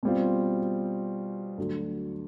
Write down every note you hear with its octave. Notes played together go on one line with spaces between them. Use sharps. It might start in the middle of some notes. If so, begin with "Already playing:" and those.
B2 G3 C4 F4
D2 D3 F#3